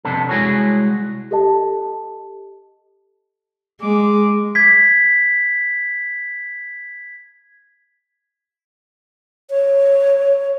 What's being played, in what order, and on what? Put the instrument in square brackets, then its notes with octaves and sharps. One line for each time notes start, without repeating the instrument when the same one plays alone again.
[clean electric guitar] F2 C3 B3 D4 A4
C2 G#3 E4 F#4 G#4 C#5
[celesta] G4 A4 D#5 A5
[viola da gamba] G#3 [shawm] D6
[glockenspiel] G#6 B6
[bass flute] C#5